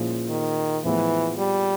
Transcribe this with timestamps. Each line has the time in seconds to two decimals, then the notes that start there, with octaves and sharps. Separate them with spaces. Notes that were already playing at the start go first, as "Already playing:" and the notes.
Already playing: A#2 F3 G#3 C#4 E4
0.30 D#3
0.84 A2 E3 F3 G#3 B3
1.38 G3